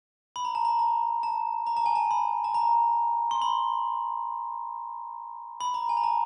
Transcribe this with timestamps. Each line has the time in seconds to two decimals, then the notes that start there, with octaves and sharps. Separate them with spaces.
0.36 B5
0.45 A#5
0.55 A5
0.65 A#5
0.79 A5
1.23 A5
1.67 A#5
1.77 A5
1.86 G#5
1.95 A5
2.11 B5
2.44 A5
2.54 A#5
3.31 C6
3.42 B5
5.60 B5
5.74 A#5
5.89 G#5
5.97 A#5
6.04 A5